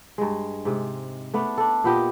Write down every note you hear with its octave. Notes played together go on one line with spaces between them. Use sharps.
G2 G#3
G#2 C3
A3 B3 D4
D4 A4
A#2 B3 G4 D#5